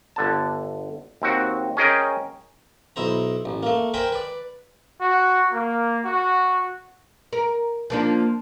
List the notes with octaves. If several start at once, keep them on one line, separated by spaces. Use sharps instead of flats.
G1 D3 A5
D#2 C4 F#4
C#4 G#4 A#4 D#5 G5
B1 E4 C5 A#5
A1
A3 A#3
A#4 C5 G5 G#5 B5
B4 D5
F#4
A#3
F#4
A#4
F3 A#3 D4